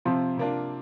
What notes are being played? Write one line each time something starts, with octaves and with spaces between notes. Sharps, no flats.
C3 F3 C4 F4
C3 A#3 D4 F4